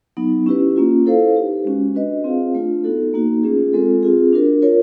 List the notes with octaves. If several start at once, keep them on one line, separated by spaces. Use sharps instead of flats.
F#3 B3 D#4
C#4 E4 G4 B4
A#3 C#4 F4
E4 A4 C5 F5
D#4 G4 B4
G#3 C#4 F#4
D4 F#4 B4 D#5
C4 F4 G#4 C5 F5
A3 D4 F4
B3 D#4 F#4 A4
A#3 D#4 F#4
A3 C#4 F4 G#4
G#3 C4 F4 A4
C4 F4 G#4
D4 F#4 A#4
F4 A#4 C#5